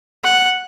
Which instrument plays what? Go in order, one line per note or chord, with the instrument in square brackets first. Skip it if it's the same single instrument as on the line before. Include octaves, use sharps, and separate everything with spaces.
[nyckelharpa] F#5